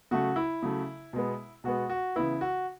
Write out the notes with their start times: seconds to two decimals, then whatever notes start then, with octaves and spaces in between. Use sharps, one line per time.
0.11 C#3 F#3 A3 F#4
0.36 E4
0.63 C#3 F#3 A3
1.13 B2 G#3 B3
1.64 B2 G#3 B3 F#4
1.89 F#4
2.16 C#3 E3 B3 E4
2.41 F#4